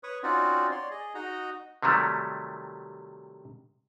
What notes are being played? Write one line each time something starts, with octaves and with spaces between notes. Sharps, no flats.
B4 C#5 C#6 D#6
C4 C#4 D#4 F4 F#4 D5
C#5 D5 C6
G#4 D#5
D#4 F#4 D#5 A#5
C3 D#3 F#3 G3 A3